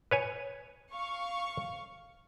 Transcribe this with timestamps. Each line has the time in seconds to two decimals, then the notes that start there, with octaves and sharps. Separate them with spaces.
0.11 B4 C#5 G#5
0.92 F5 C#6